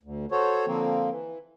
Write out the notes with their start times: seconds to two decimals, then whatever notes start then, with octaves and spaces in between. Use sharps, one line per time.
0.03 D2
0.31 F#4 A4 C5 C#5
0.67 D3 F3 A#3 C4
1.10 E3